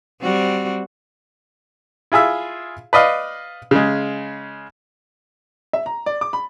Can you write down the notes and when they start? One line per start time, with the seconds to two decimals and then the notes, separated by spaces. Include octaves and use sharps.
0.21 G3 C4 F#4
2.12 E4 F4 G#4 E5
2.93 B4 D5 D#5 F5
3.71 C#3 G#3
5.73 E5
5.86 A#5
6.06 D5
6.21 D6
6.33 B5